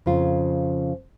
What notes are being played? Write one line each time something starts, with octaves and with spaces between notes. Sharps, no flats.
F2 C#3 F4